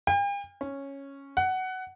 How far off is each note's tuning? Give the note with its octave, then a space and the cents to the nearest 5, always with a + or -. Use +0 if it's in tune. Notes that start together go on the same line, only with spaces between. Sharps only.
G5 +45
C#4 -5
F#5 +15